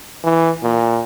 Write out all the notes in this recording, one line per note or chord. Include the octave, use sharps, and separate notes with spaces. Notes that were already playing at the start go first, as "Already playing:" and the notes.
E3
A#2